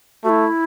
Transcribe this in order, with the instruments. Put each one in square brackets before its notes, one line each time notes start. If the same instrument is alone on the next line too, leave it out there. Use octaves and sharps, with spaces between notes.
[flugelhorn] A3 [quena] E4 F#4